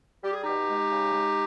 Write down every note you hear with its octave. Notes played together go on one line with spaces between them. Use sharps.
G3 G4
G#4
B2 D#4 G4
G#3
C#3
G#3